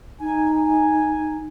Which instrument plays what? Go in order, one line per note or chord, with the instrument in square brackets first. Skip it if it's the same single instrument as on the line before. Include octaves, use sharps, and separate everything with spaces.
[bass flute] D#4 [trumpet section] G#5
[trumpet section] G#5